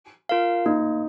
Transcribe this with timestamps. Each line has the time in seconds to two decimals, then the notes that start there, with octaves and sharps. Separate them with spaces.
0.29 F4 A#4 F5
0.66 A#3 D#4